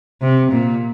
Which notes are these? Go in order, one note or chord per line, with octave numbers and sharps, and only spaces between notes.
C3
A#2